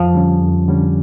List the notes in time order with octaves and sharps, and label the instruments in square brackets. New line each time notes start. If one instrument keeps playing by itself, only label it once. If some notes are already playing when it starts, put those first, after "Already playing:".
Already playing: [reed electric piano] F2 [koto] F3
[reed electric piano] D3 G3 C#4
F2
D3 G3 C#4